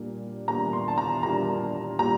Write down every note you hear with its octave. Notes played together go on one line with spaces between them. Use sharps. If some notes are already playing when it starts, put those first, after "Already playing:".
Already playing: A#2 G3 A#3 D4
A#2 G3 A#3 D4 A#5
C6
A5
A#5
A#2 G3 A#3 D4 A#5
A#2 G3 A#3 A#5